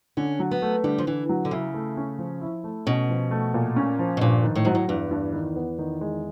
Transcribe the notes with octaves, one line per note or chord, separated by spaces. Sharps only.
D3 C#4
F#3
B3
A3
D3 G3
F3
D3 E3
F#3
D3
C#3 E4
A3
C#4
F3
E4
A3
B2 C#4
F3
A3
A#2
C#4
F3
B2
G2 A#2
D#3
A2
G#2 F#3
A2
E2 G2
G2
D#3
B3
D#3
G#3